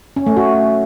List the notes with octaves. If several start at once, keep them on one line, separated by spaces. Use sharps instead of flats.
C#4
A3
F#4